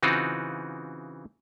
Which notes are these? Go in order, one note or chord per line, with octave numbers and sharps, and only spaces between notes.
C#3 E3 C4 D#4 F4 F#4